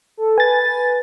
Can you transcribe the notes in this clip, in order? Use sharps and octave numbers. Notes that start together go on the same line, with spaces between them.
A4
B4 G#5 A6